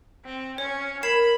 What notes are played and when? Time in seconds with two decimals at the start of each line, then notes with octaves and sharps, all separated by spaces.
0.24 C4
0.58 C#4 C#5
1.03 A#4 B5 G#6 C7 E7